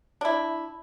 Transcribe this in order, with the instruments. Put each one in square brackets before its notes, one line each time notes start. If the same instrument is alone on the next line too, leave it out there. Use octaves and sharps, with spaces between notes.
[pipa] D4 E4